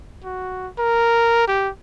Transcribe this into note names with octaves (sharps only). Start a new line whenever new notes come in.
F#4
A#4
G4